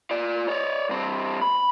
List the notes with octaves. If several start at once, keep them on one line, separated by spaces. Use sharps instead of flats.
F4 D5
C#5 D5
G2 C4
B5